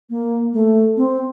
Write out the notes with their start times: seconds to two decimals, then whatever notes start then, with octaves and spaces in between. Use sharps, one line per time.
0.10 A#3
0.53 A3
0.97 C4